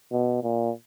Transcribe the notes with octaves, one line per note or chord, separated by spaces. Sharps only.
B2
A#2